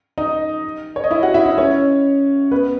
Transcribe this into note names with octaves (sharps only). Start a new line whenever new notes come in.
D#4 D#5
C#5
D#5
E4 E5
F#4 F#5
E4 E5
E4 E5
C#4 C#5
B3 B4